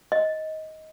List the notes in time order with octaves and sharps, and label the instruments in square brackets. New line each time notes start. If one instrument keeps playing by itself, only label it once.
[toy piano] D#5